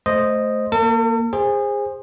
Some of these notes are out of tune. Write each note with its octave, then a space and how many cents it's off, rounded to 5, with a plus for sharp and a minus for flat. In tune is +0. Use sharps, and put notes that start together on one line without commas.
A3 -15 C5 +0 D#5 -5
A#3 +0 A4 +45
G#4 -25 C5 +15